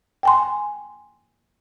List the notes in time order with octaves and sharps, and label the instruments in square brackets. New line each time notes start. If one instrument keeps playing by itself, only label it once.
[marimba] G5 G#5 C6